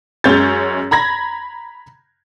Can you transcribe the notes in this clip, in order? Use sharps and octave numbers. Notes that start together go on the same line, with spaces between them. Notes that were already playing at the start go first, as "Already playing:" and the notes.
F#2 G#3 C#4 G6 A6
A#5 B5 G#6 A#6